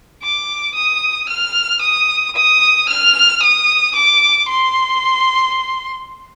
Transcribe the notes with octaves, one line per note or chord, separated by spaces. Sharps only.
D6
D#6
F6
D#6
D#6
F6
D#6
D6
C6